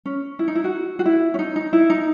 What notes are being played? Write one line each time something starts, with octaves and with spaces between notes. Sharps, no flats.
C#4
E4
D#4
E4
F#4
F#4
E4
C#4
D#4
D#4
E4
D#4